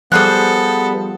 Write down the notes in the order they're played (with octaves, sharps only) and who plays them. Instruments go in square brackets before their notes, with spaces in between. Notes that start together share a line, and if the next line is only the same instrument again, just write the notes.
[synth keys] F3 G3 [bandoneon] B3 [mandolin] G#4 C5 F#6 [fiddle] A4